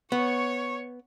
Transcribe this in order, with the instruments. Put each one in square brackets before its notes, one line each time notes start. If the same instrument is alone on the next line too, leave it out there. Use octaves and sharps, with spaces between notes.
[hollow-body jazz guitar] B3 [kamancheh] C#5 C#6